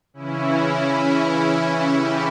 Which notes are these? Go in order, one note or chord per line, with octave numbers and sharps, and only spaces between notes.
C#3 E3 C#4 E4
C#4 E4
E4 G4